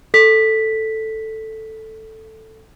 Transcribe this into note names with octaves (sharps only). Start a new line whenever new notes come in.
A4 B6